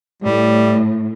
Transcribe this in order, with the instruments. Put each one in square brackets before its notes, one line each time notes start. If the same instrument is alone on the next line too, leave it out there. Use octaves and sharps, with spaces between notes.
[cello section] A2 [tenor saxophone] G3